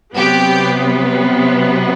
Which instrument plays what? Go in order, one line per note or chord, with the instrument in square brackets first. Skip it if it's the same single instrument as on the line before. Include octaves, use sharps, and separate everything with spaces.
[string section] C3 F#3 B3 G4